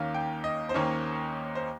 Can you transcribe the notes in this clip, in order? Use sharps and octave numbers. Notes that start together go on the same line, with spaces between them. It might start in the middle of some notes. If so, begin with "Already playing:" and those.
Already playing: D#2 D#3 A#3 C#4 F5
G5
D#5
C5
D#2 D#3 A#3 C#4 C#5
C5